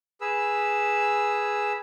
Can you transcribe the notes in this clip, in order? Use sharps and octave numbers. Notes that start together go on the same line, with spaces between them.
G#4 B4 E6